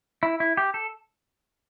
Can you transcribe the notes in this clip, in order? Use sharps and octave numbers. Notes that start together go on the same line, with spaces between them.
E4
E4
G4
A4